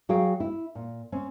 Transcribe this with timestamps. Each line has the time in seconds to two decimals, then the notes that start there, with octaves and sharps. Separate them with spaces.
0.09 F#3 F#4 G#4 F5 G5
0.40 E4
0.75 A#2
1.12 C4 C#4